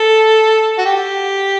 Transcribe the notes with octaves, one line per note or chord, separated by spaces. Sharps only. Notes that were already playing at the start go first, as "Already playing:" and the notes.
Already playing: A4
F#4
G4